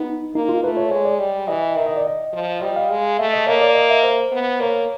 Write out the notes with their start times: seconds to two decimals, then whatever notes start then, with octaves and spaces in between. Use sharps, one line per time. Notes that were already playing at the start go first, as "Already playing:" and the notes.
Already playing: B3 D#4
0.34 A#3 D#4
0.49 F4
0.63 A3 B4
0.77 C#5
0.91 G#3 C#5
1.05 D5
1.19 G3
1.48 E3 D#5
1.76 D#3 E5
1.86 D#5
1.96 D5
2.07 D#5
2.33 F3
2.62 G3 D#5
2.76 F5
2.90 G#3
3.18 A3 E5
3.33 D#5
3.47 A#3 C#5
3.62 D5
3.75 D#5
3.90 E5
4.03 C5
4.32 B3
4.60 A#3 C#5